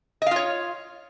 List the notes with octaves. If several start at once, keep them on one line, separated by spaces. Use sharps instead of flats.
F4 C#5 D#5 F5